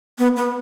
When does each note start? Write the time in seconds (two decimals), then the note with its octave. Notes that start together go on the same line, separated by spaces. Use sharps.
0.19 B3
0.37 B3